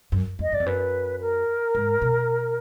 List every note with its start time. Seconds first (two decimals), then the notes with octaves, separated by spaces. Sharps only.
0.12 F#2
0.39 F2 D#5
0.52 F#2 D5
0.60 F2
0.66 F#2 B4
1.21 A#4
1.75 G#2
2.02 B2